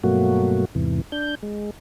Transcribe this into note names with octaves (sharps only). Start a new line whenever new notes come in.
G2 B2 F#3 A3 A#3 F#4
E2 G#2 C3 E3
D4 G6
G#3